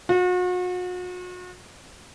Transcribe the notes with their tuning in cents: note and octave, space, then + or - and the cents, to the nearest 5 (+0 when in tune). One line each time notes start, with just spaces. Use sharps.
F#4 -40